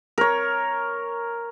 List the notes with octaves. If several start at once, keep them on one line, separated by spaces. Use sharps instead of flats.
A#4 C#5